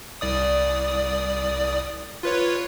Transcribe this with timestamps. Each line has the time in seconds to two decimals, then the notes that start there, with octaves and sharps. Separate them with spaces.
0.21 C2 D5 D#6
2.23 F4 B4 C#5